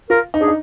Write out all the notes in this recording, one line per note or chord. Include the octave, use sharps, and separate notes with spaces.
F4 A#4
D#4
D4 G#4
D#4